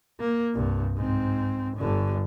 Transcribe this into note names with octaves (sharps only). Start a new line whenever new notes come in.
A#3
C2 G2
G#2 C4
G1 D3